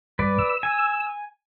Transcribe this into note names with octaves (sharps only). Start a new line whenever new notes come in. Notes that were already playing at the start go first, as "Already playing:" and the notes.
G2 B4 D5
E6
G#5